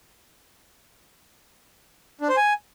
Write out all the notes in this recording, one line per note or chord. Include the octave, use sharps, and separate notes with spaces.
D4
C5
G#5